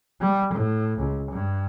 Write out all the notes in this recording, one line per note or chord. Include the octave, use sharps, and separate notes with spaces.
G3
A2
C#2
G2